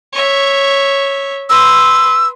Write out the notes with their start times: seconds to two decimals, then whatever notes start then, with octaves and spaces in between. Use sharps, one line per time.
0.13 C#5 E5
1.50 B4 C6 E6